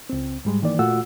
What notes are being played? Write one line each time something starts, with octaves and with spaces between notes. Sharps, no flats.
C#2 C4
G#2 G3 G#3
D#3 E3 A#3 D5
A#2 A3 F4 F#4 F#5 E6